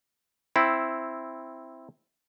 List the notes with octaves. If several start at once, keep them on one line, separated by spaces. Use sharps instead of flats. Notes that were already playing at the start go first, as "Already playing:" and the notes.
C4 E4